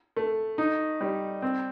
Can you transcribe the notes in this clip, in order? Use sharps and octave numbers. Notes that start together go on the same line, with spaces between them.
A3
D#4
G3
C4